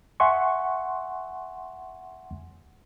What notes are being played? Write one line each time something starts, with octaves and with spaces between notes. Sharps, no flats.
E5 F#5 G#5 C6 C#6